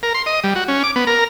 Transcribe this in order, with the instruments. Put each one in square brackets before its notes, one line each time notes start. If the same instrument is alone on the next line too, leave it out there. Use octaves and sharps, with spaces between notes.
[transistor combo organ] A#4
C6
D#5
G3
F#4
C#4
D6
B3
A#4